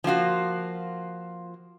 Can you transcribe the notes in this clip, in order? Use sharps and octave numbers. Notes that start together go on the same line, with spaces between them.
F3 A#3 F4 F#4